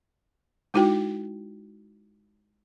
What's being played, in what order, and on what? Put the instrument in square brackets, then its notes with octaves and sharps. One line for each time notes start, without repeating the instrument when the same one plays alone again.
[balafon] G#3 D#4 E4 F#4 G5